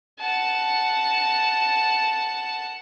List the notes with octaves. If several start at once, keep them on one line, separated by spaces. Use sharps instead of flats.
F#5 A5